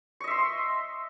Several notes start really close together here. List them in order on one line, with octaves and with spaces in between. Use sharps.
C#6 D#5 E5 C6